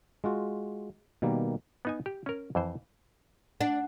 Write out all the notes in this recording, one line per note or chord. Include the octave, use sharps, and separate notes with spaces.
G#3 F4 F#4
B2 D#3 G3 A#3
B3 D#4 G#5
G4
C#4 A#4
F2 E3 C5
D4 F#5